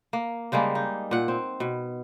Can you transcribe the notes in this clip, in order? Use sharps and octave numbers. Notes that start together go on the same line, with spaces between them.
A#3
C#3 G3 G#3 A#3
D#4
A#2 F#5
C4
B2